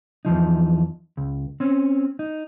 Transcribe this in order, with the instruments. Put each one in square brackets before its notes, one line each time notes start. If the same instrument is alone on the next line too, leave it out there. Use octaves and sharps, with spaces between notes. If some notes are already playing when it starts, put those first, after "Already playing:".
[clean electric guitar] E2 E3 F3 D#4
C#2
C4 C#4
D#4